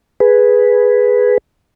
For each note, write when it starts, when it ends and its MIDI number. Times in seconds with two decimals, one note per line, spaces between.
0.20 1.38 68
0.20 1.38 71